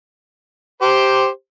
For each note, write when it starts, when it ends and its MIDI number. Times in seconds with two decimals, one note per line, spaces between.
0.82 1.27 67
0.82 1.27 72